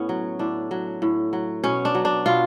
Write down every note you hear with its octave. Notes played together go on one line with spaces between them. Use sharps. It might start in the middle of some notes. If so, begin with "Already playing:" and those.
Already playing: A2 B3 C#4
F#3
A2 D4
F#3
A2
F#3
B2 C#4
D4
F#3
D4
B2 F4